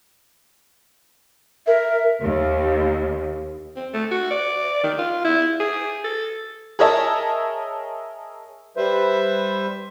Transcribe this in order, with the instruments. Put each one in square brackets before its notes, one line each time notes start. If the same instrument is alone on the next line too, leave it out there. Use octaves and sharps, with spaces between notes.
[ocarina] A#4 [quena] E5
[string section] D#2
[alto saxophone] C4
A3
F#4
D5
D#3
F4
E4
G#4
A4
[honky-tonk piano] G#4 A#4 C#5 D#5 E5 A5
[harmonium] G3 B4 C5 E5